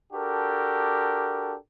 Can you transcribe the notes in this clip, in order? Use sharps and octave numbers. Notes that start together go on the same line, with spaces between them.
D4 F#4 G4 A4 A#4